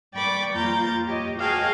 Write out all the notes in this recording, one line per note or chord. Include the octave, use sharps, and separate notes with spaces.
D5 G5 B5 C#6 D6
F2 A#3 F4 A#5 G6 A6
G4 C#5 D#5
F#4 G#4 D#5 F5 G5 A5